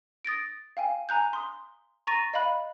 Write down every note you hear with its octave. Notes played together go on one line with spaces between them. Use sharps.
D#6 A6 A#6 D7
F5 G5 G#5
G#5 A#5 F#6 G6
C6 D#6
A#5 C#6 A6 A#6 D#7
D#5 F5 B5 F#6